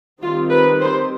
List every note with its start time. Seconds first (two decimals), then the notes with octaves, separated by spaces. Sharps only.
0.20 D#3 G3 C4 F4
0.50 B4
0.81 C5